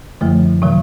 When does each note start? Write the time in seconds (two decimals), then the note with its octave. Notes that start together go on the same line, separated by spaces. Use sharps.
0.21 F#2 D3 F3 A3
0.62 C3 D#3 F#3